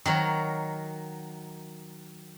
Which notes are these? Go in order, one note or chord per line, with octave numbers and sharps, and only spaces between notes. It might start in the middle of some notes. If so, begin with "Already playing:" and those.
D#3 F#3 A#4 C#5